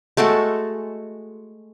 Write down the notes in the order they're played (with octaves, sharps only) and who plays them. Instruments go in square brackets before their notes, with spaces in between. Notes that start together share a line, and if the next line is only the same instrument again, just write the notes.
[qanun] G#3 A3 F#4 A4